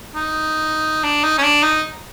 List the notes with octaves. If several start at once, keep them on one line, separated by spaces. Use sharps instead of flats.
D#4
D4
D#4
C#4
D4
D#4